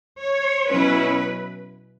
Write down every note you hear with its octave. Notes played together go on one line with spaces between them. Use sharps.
C#5
B2 F#3 C#4 E4 B4